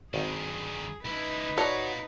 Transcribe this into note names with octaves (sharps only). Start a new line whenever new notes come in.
G#1 G2 D#3 G#4
C#2 D#4 E4 B4
F4 F#4 A4 C#5 D5 A#5